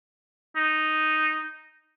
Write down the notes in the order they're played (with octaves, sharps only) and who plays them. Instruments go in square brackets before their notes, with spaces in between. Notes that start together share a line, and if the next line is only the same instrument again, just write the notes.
[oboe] D#4